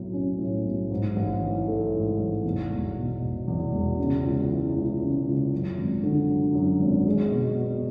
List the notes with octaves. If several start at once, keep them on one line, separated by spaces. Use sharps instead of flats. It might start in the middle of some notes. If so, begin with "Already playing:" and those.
Already playing: B1 A2 F#3
C#4
A2
B1
G#2
A1
E3
A3
G#2
A1
E2
E1
B2
E1
E2
E1
C#3
C#2
E3
C#2
C#3
C#2
F#2
G#1
D3
F#3
F#2
G#1
G#3
B2
B3